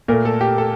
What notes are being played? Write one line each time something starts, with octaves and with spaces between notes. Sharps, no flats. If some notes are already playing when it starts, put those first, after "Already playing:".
A#2 A3 A#4
A4
G4
A4